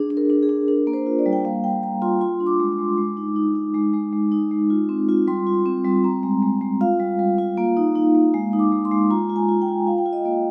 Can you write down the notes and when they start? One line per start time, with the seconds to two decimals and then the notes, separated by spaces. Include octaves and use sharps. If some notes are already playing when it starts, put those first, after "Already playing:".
Already playing: D4 G#4
0.10 D4
0.17 A#4
0.30 D4
0.43 G#4
0.49 D4
0.68 D4 A#4
0.87 A#3
0.93 C5
1.06 F4
1.19 D5
1.26 G3
1.33 G5
1.45 A#3 F5
1.64 G3 G5
1.83 G3 A#5
2.02 F4 C6
2.21 F4 C6
2.40 D4
2.47 D6
2.60 G#3
2.72 D6
2.79 G#3
2.98 G#3 D6
3.17 D#4
3.36 D#4
3.55 D#4
3.75 G#3
3.94 G#3
4.13 G#3
4.32 D#4
4.51 G#3
4.70 F4
4.89 C4
5.09 F4
5.28 G3 C6
5.47 F4
5.66 C4
5.85 G3
6.04 C4 A#5
6.23 G#3
6.43 G#3
6.61 G#3
6.81 F4 F5
7.00 G3
7.19 G3
7.38 F4
7.57 A#3
7.77 D#4
7.96 D#4
8.15 A#3
8.34 G#3
8.53 D#4
8.59 D6
8.72 G#3
8.85 C6
8.91 G#3
9.10 F4 A#5
9.30 F4
9.36 G#5
9.49 F4
9.62 G5
9.68 F4
9.87 F4 F5
9.98 G5
10.05 F4 F5
10.13 D#5
10.25 A#3